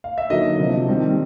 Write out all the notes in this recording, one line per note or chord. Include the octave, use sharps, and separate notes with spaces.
F5
E5
D3 F#3 A#3 D#4 D#5
C3 F3 A#3 D4
D#3 G3 C4